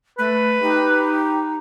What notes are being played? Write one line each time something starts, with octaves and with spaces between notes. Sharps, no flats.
A3 B4
D#4 G4